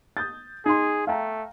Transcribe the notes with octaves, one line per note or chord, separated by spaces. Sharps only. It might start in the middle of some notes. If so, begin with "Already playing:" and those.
D#6 G6 A6
D#4 G#4 C6
A3 F5 G5 A#5